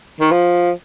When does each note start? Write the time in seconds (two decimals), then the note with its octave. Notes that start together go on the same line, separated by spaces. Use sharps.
0.21 D#3
0.32 F3